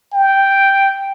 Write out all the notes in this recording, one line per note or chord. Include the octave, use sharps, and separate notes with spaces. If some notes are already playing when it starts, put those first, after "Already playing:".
G5